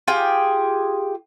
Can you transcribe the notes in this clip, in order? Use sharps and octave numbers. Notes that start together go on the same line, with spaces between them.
F4 G4 G#4 G5